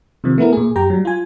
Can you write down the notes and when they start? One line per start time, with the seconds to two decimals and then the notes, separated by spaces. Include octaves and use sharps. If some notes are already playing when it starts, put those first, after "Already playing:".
0.24 C3 D#3 F3
0.38 A3 B3 E4 A#4
0.53 A#2 G#4
0.75 F#2 G4 G5 A#5
0.90 F#3 G3
1.05 F4 G#5